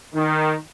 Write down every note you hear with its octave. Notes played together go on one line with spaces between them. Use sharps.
D#3